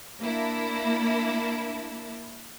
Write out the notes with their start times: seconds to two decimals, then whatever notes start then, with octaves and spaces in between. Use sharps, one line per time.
0.21 A#3 D4 E4